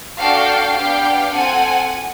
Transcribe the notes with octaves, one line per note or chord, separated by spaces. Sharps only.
D4 F#4 A4 F5 G5
B3 D4 G4 F5 G5
C4 F4 A4 F#5 G#5